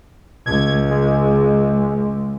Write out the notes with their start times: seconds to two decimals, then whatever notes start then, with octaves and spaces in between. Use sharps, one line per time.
0.46 C#2 G#6
0.90 G#3